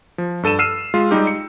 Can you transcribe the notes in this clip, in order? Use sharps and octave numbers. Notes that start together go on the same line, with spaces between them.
F3
G2 A4 D#7 E7
E6 F6 C7 D#7 E7
G#3 F4
G3 G#3 D#4 G4
C#7